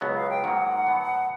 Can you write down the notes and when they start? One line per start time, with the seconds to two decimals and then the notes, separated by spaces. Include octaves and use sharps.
0.01 C#2 B2 F#3 B3
0.16 F5
0.30 G5
0.44 G#2 D#3 F#3 A#3 F#5
0.87 A2 F#3 B3